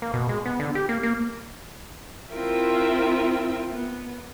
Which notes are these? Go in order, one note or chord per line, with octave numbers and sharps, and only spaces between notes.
A#3
B2
G#3
B3
D3
G4
A#3
A#3
C4 E4 F4 A#4 E5 G5
B3